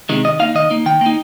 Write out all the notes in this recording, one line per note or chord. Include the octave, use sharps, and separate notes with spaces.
C3 D#3 G#3
D#3 D#5
A#3 D#4 F5
D#3 D#5
A#3 D#4
D#3 G5
A#3
D#4